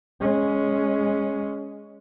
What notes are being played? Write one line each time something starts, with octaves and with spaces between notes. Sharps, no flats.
G#3 C#4